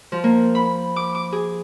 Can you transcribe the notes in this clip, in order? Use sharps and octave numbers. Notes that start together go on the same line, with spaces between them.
F3
A#3
B5
D6
D6
G#4